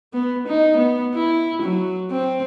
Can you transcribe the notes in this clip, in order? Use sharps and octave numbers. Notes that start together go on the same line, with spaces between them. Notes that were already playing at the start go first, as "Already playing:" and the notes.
B3
D#4
B3
E4
F#3
C4